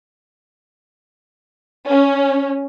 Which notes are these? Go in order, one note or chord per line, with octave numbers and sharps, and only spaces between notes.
C#4